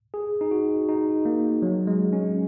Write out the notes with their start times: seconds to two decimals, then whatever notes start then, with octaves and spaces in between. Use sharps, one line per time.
0.14 G#4
0.41 D#4
0.51 F#4
0.88 D#4
1.25 A#3
1.62 F#3
1.87 G#3
2.13 C#4